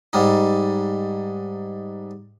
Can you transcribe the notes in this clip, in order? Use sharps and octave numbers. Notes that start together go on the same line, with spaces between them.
G#2 G3 D#4